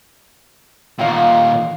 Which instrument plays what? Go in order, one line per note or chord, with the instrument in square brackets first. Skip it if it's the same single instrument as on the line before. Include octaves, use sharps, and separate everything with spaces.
[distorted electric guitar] D#2 A#2 [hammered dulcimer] F5 G5